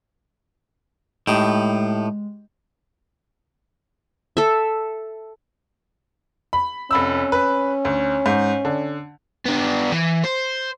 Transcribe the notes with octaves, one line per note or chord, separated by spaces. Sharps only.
A2 G#3 D#4 G4
A4 E5
B5
F1 C#4 B5 E6
B4
D2
G#2
D3
B3 D4
E3
C5